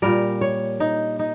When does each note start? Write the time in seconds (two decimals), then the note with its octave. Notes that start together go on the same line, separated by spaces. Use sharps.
0.02 A#2 G3 A#4
0.41 C#5
0.80 D#4
1.19 D#4